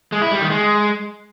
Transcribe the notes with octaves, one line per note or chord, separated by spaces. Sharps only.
G#3
E4
G3
D#3
G#3